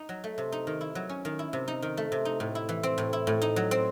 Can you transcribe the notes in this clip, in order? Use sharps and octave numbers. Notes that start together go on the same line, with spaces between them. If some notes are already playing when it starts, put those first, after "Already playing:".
Already playing: D#4
F#3
A3
C3
D#4
D#3
E4
F#3
C#4
D#3
E4
C3
D#4
D#3
A3
C3
D#4
A2
E4
E3
C4
A2
E4
A2
D#4
F#3
C4